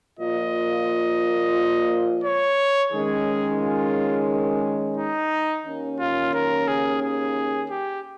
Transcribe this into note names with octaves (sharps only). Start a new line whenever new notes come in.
A#2 F3 A#3 F4 D#5
C#5
D#3 G#3 C#4 G#4
F4
D#4
D#2 D#3 A#3 C#4
F4
A#4
G#4
G#4
G4